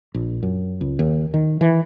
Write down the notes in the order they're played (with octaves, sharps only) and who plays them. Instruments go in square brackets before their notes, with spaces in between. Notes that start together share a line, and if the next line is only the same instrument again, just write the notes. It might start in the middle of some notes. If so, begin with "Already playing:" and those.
[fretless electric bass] A#1
F#2
C#2
D#2
D#3
E3